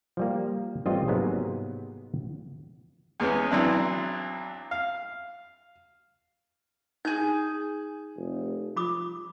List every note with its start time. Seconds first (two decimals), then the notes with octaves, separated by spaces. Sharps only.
0.17 F3 G3 A#3
0.86 A1 G3 C4 F4 D#5
1.08 G#2 C3 F#3 G#3 A#3 B3
3.20 E2 G#3 B3 C#4
3.51 B1 E3 F#3 C4 D4 E5
4.71 F5
7.05 D#4 G#4 G6
8.17 F1
8.77 F3 B5 D6 D#6